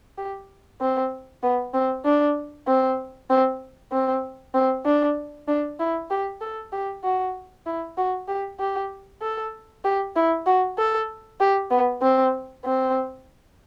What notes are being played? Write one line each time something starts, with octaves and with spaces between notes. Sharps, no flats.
G4
C4
B3
C4
D4
C4
C4
C4
C4
D4
D4
E4
G4
A4
G4
F#4
E4
F#4
G4
G4
A4
G4
E4
F#4
A4
G4
B3
C4
C4